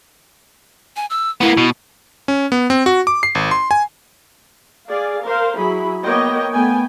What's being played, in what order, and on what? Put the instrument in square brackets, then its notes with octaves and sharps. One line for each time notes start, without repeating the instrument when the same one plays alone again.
[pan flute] G#5
E6
[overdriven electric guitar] A#3 B3 [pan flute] E4
[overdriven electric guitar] B2
[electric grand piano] C#4
B3
C4
F#4
D6
C7
G#1
C6
G#5
[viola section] G#4 D5 F5
A#4 C5 F5
F#3 E4 G#4 B5
A#3 B3 C#5 D#5 G5
A3 B3 G5 G#5